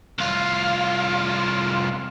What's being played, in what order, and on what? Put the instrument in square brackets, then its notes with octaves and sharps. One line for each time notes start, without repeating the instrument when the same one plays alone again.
[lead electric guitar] C2 F4